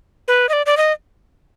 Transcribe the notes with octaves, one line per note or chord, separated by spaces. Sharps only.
B4
D#5
D5
D5
D#5